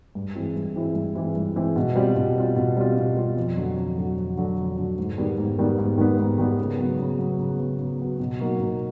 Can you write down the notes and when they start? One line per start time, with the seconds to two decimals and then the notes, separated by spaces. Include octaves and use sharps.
0.15 G2
0.35 E3 G#3 C4 E4
0.56 G2
0.76 E3 G#3 C4 E4
0.95 G2
1.15 E3 G#3 C4 E4
1.36 G2
1.56 E3 G#3 C4 E4
1.76 B2
1.96 G3 C4 F4
2.16 B2
2.36 G3 C4 F4
2.56 B2
2.77 G3 C4 F4
2.97 B2
3.17 G3 C4 F4
3.37 F2
3.57 D3 F#3
3.77 F2
3.97 D3 F#3
4.17 F2
4.37 D3 F#3
4.57 F2
4.77 D3 F#3
4.98 G#2
5.18 D#3 G3 B3
5.38 G#2
5.59 D#3 G3 B3
5.78 G#2
5.98 D#3 G3 B3
6.19 G#2
6.38 D#3 G3 B3
6.58 C#3
6.79 F#3 B3
6.99 C#3
7.19 F#3 B3
7.39 C#3
7.59 F#3 B3
7.79 C#3
7.99 F#3 B3
8.20 B2
8.40 F#3 A#3 D#4 F#4
8.60 B2